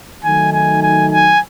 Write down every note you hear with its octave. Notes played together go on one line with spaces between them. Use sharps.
D#3 F#3 A3 D#4 G#5
G#5
G#5
G#5